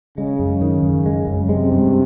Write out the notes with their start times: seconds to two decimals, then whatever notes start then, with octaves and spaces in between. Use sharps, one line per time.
0.18 C#3 G#3
0.39 F#2
0.62 D#3
0.83 F#2
1.06 G#3
1.27 F#2
1.49 C3 G#3
1.72 G2